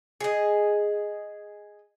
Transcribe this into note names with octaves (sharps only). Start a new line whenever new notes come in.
G#4 D#5